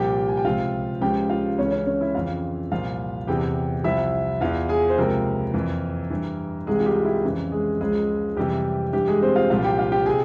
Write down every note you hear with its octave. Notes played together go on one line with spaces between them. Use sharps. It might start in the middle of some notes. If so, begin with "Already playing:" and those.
Already playing: C2 A#2 F3 G4 G5
G#5
G5
C#2 C3 F3 F4 F5
C#2 C#3 F3 G4 G5
F4 F5
C#2 C#3 E3 C#4 C#5
C#4 C#5
C#4 C#5
E4 E5
F2 C#3 E3 F4 F5
C2 A#2 F3 F4 F5
E2 C3 E3 G4 G5
C2 C3 F3 E4 E5
E2 E3 F4 F5
G#4 G#5
C5
C#2 C3 F3 A#3 A#4
F2 E3
G2 E3
C2 C3 E3 G#3 G#4
F4
G3 G4
E4
F2 C#3 E3
G#3 G#4
C#2 C#3 F3 G#3 G#4
F2 C3 E3 G3 G4
G2 E3 G3 G4
G#3 G#4
C4 C5
F4 F5
C2 A#2 F3 F4 F5
G4 G5
F4 F5
G4 G5
C3 G#4 G#5